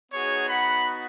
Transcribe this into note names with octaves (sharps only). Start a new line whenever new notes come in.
B3 D#4 F#4 G#4 C#5
F#5 B5